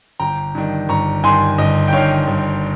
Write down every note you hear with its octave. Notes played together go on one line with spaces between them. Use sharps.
G1 G5 A#5
G2 D#3
G1 A#5 C#6
G2 D#3 G#5 C6
G1 D#5
G5
G2 D#3 C#5 F5
G1